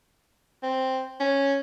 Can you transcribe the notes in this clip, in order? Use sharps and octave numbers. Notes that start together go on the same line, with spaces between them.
C4
C#4